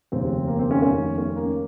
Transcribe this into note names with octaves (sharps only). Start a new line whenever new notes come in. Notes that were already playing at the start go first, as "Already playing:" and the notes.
F1 D#2 C#3 C4
A#3
C4
C#4
F1 D#2 D#3 C#4
C#4
A#3